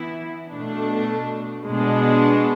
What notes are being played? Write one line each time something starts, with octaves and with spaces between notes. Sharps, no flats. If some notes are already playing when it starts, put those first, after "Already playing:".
Already playing: E3 B3 E4
B2 A3 D4
B2 G#3 B3 D4